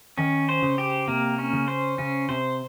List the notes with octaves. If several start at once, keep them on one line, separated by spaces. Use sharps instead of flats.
D#3 C#4
C5
C#3
G4
C3 A#3
C#4
C#3
C5
C#3 C#4
C3 C5